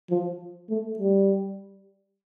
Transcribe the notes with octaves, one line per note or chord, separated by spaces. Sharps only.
F3
A3
G3